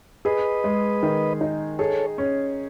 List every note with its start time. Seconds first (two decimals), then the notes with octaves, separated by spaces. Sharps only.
0.25 G#4 B4 D#5
0.64 G#3
1.03 D#3
1.41 D#4
1.79 G#4 A4 C#5
2.18 C#4